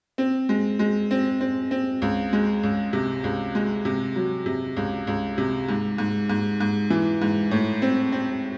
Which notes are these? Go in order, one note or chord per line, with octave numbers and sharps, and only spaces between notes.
C4
G#3
G#3
C4
C4
C4
C#2
G#3
C#2
C3
C#2
G#3
C3
F#3
C3
C#2
C#2
C3
G#2
G#2
G#2
G#2
E3
G#2
A2
C4
C4